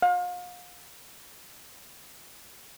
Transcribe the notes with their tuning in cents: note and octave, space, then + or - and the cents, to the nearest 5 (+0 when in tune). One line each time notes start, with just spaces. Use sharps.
F5 +40